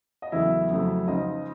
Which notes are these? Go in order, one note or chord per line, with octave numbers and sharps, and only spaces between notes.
D#5
E2 C#3 F#3 A3 E4 E5
F2 C#3 F#3 A3
C#2 C#3 F3 D#4 D#5